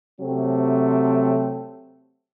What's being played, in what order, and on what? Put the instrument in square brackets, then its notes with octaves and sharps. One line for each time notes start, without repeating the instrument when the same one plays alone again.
[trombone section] C3 F#3 A3 C4